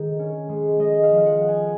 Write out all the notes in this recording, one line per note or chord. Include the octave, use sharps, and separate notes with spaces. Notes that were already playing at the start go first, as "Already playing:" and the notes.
Already playing: D#3 G#3
C#4
G#3
G#3 D#5
F5
F3
F5
F#5
B3
G#5